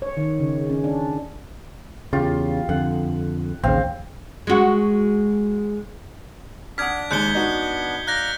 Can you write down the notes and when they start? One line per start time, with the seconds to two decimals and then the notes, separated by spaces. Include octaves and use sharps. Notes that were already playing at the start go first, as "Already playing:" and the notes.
0.02 C#5
0.17 D#3
0.40 C#3
0.70 C#4
0.84 D4
2.13 E2 C#3 F4 G4
2.69 F2 D3 F#5
3.63 A1 D#2 C#3 C4 F5
4.47 G#3 F#4
6.78 D4 F#5 D6 D#6 F6 G#6 B6
7.11 D#2 G#3 F#6 G6 C#7 G7
7.35 B3 D4 D#4 F#4
8.07 D5 F5 A#5 F#6 G6 A#6